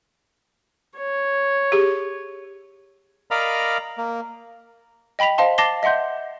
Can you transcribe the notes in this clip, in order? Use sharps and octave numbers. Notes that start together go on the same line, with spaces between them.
C#5
G4 G#4
A#4 D5 D#5 F5 A#5 B5
A#3
D#5 G5 B5 B6 F7
C5 D#5 F5 A5 C6
A5 D6 A6 A#6 C7 G7
D#5 E5 F#5 C6 G6